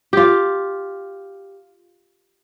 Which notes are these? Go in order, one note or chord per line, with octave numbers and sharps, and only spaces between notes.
F4 G4